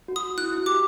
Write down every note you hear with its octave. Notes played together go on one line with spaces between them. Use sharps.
F#4
D#6
F#4
E4 F#6
E4
G4 D6